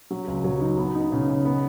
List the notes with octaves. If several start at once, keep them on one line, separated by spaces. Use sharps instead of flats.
F#3
C#2
F#3
D#4
B3
D#4
C#3
C#3
B3